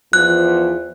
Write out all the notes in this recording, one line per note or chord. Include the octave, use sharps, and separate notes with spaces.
E2 F3 F#6